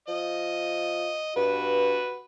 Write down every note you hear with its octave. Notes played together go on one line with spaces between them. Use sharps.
F3 D#5
G2 F#4 B4